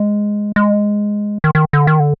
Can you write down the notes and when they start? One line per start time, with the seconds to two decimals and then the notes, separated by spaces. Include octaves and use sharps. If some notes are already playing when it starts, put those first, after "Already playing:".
Already playing: G#3
0.56 G#3
1.44 D#3
1.55 D#3
1.73 D3
1.87 D#3
2.00 D3